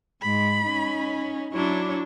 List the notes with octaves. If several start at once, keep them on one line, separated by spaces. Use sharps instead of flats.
G#2 G#3 B5
C#4 D#4
F#3 D4 E4 C#5